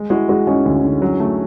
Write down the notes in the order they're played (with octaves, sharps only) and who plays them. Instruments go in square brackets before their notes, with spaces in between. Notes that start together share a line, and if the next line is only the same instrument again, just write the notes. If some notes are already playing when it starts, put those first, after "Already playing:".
Already playing: [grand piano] G#3
[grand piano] G#3 [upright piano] E4 F#4
[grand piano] G#3 [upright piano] F#4 G#4
[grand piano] G#3 [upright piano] C#4 D#4
[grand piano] D2
D3
F#3
A3